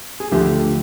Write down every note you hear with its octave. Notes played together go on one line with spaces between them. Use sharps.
G#4
D2 D3 F3 A3 G4